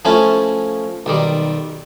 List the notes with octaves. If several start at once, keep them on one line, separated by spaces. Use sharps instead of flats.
F3 A3 C#4 E4 F4
B1 D#3 G3